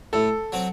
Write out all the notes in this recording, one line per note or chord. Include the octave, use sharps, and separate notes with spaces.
A2 A4
F#3 C4